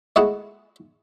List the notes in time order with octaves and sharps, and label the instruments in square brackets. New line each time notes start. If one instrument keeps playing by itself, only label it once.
[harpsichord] G#3 A3 E4 F#4 G#4 F#5